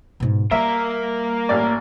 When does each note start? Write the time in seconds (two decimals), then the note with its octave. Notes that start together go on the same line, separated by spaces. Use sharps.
0.20 G#2 B2
0.51 G3 A#3 A#4 E5
1.49 A1 D5